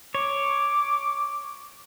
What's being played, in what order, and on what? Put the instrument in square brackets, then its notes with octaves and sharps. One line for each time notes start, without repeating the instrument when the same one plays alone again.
[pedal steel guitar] C#5 [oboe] D6